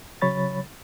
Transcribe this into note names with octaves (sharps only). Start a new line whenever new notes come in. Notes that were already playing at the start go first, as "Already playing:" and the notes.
C#3 F#3 C#5 B5 A6